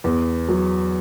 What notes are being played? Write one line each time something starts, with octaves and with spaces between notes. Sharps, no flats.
E2
F#3